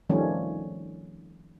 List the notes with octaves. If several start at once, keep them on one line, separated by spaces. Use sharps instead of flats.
D#3 F3 G3 A3 C#4